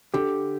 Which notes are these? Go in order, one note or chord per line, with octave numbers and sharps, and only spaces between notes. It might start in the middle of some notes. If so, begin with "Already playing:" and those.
D3 G4